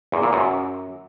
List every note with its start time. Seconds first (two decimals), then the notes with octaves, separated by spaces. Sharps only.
0.12 E2
0.23 A#2
0.33 F#2